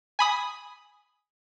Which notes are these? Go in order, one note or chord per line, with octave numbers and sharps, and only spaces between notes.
G#5 B5 D#6